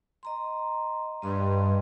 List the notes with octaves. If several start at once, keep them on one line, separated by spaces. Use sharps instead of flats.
D#5 A#5 C6
G2 D#5 C6